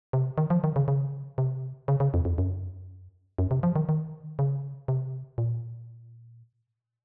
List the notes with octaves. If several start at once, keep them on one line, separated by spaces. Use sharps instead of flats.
C3
D#3
F3
D#3
C#3
C#3
C3
C#3
C#3
F2
F2
F#2
F#2
C3
F3
D#3
D#3
C#3
C3
A#2